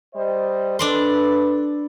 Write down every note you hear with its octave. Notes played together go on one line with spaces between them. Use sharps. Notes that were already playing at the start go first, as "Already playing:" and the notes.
G3 C5 D#5
D4 A4 B4 D5 C6